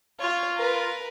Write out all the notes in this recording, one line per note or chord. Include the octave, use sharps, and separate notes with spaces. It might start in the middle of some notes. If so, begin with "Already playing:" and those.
F4 C#5
A#4 B4